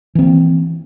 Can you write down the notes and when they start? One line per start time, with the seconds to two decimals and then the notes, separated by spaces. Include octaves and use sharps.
0.15 E3
0.19 C4
0.22 A#3